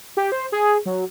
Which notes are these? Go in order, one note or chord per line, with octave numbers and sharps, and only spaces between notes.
G4
C5
G#4
F#3